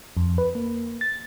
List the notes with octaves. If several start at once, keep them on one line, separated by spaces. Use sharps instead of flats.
F2
B4
A#3
A6